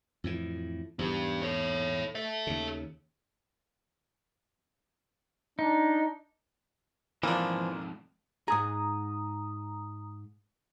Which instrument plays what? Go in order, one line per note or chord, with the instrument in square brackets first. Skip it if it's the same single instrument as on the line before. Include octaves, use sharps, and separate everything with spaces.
[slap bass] F2 A2 E3
[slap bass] E2 G#2 [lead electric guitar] D4 G4
[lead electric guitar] A4 C#5
A4 E5
[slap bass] D#2 C#3
[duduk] D4 [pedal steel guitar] D#4
[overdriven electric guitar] F2 G#2 [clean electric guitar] E3 F3 [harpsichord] A#3 D4
[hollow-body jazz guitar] G#2 G#4 [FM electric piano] A#5 D#6